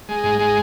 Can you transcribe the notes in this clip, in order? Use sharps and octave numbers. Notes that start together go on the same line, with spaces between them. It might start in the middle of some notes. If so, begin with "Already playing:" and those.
G#3
G#2
G#3